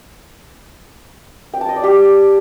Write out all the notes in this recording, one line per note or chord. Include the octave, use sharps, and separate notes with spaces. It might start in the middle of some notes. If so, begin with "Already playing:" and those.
G5
A5
D#5
D5
G4